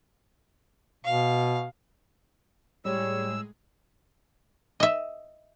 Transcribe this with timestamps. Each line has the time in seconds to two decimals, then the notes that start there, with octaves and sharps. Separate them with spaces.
1.05 B2 F5
2.85 A2 G3 G#3 G#4 C#5 E6
4.80 D#5 E5